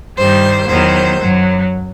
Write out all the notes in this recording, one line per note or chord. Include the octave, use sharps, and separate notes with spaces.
G2 D#3 G3 C5
E2 D#3 F#3 C5
F#2 F#3